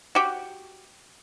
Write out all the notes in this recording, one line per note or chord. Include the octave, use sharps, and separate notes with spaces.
F#4 G4